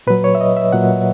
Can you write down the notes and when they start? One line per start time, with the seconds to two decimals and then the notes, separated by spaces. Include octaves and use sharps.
0.07 A#2 F#3 B4
0.24 C#5
0.35 E5
0.41 D#5
0.57 E5
0.72 A#2 F#3 F#5